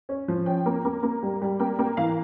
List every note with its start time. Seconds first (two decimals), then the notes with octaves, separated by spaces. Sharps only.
0.09 C#4
0.28 F3
0.46 C#4 G5
0.66 A#3
0.85 A#3
1.03 A#3
1.23 G3
1.42 G3
1.60 A#3 G5
1.79 A#3 G5
1.97 E3 F5